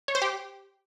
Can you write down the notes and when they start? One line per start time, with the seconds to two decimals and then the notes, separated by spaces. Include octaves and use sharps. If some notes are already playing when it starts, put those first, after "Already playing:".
0.08 C#5
0.15 C5
0.22 G4